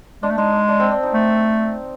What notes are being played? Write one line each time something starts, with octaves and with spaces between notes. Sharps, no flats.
G#3 D4
A3
G#3 D#4
D4
D4
C4
D4
D#4
A3